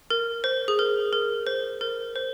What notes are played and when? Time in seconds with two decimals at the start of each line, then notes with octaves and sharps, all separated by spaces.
0.10 A#4
0.44 C5
0.68 G#4
0.79 A#4
1.13 A#4
1.47 C5
1.81 A#4
2.16 C5